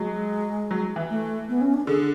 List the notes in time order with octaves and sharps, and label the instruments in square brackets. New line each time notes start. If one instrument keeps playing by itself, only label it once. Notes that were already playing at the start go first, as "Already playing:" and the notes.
Already playing: [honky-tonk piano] F#3 [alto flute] G#3
[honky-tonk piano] F#3
E3
[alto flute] A3
B3
C#4
D4
[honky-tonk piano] D3 [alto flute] G#4